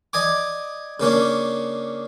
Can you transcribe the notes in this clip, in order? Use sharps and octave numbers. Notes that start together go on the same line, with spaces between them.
D5 D#5 G#5 D6
C#3 A#3 C#4 D4